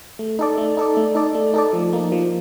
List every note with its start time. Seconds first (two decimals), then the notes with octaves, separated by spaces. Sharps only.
0.19 A3
0.39 D#4 A4 D5
0.58 A3
0.77 D#4 A4 D5
0.97 A3
1.15 D#4 A4 D5
1.35 A3
1.54 D#4 A4 D5
1.73 F3
1.93 A#3 D#4
2.12 F3